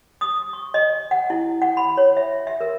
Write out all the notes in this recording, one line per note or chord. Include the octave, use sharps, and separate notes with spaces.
D#6
C#6
D#5
F#5
E4
F#5
B5
C#5
E5
E5
A#4